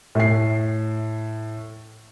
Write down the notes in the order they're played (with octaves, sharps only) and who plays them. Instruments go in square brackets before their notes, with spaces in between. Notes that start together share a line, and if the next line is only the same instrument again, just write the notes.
[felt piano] A2 C7